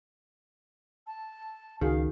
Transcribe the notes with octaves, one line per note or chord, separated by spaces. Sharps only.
A5
C#2 D#3 F#4 G#4 F5